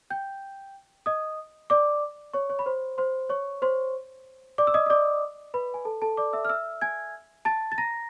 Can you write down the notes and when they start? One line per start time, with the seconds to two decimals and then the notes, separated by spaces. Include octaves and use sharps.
0.10 G5 G6
1.06 D#5 D#6
1.70 D5 D6
2.33 C#5 C#6
2.50 C#5 C#6
2.59 B5
2.66 C5 C6
2.98 C5 C6
3.30 C#5 C#6
3.62 C5 C6
4.58 D5 D6
4.67 E6
4.74 D#5 D#6
4.86 D#6
4.90 D5 D6
5.54 B4 B5
5.74 G#5
5.85 A4 A5
6.02 A4 A5
6.17 D5 D6
6.33 E5 E6
6.45 F6
6.49 E5 E6
6.81 G#5 G#6
7.45 A5 A6
7.72 A6
7.78 A#5 A#6